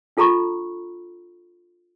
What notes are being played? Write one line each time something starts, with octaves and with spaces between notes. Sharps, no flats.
D4 F4 A4 A#5 B5 C#6